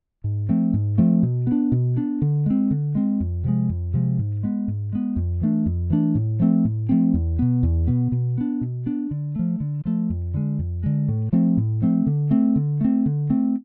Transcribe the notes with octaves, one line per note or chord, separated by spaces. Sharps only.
G#2
F3 A3 C4
G#2
F3 A3 C4
B2
B3 D4
B2
B3 D4
D3
G#3 C4
D3
G#3 C4
F2
C3 F3 G#3
F2
C3 F3 G#3
G#2
G#3 B3
G#2
G#3 B3
F2
E3 A3 D4
F2
E3 A3 D4
A2
F3 A3 C4
A2
F3 A3 C4
E2
B2 B3
E2
B2 B3
B2
B3 D4
B2
B3 D4
D3
F3 A3
D3
F3 A3
F2
D3 G#3
F2
D3 G#3
A2
F3 A3 C4
A2
F3 A3 C4
D3
A3 C4
D3
A3 C4
D3
A3 C4